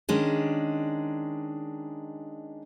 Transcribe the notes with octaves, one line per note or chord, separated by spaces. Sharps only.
D#3 G#3 C#4 D4